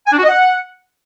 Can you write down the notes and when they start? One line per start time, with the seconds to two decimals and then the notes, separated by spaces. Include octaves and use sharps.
0.07 G#5
0.12 D4
0.18 F#4
0.23 D#5
0.29 F#5